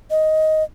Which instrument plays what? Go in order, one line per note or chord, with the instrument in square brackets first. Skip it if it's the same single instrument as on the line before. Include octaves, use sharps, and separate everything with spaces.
[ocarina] D#5